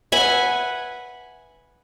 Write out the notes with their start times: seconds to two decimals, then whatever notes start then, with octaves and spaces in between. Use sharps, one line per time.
0.12 B4 E5 F#5 G#5